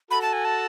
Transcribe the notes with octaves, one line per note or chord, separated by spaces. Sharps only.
F#4 A4 B5
A5
G#5
A5